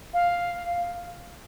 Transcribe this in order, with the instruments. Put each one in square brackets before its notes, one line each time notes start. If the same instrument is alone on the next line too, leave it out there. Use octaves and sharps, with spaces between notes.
[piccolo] F5